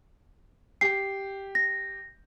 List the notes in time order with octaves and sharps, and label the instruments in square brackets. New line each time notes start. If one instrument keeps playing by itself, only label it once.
[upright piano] G4 [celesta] C7
[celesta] A#6